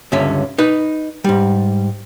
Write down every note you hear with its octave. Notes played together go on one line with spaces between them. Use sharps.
C#2 G2 D3 C#4 E5
D#4 B4
G#2 G3